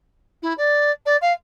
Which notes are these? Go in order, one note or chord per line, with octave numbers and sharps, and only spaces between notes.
E4
D5
D5
F5